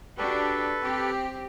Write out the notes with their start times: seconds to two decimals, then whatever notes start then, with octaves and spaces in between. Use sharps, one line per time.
0.18 D4 F#4 G4 A4 B4
0.81 C4 G4